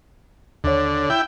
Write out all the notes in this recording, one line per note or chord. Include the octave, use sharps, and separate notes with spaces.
D#2 D3 C#5
E4 G5